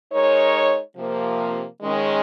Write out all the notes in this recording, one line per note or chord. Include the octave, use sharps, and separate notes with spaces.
G#3 D#4 A#4 C#5
C3 F3 A#3
D#3 G#3 C#4